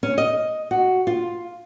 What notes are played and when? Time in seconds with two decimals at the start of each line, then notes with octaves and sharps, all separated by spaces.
0.03 C#4
0.18 D#5
0.71 F#4
1.07 F4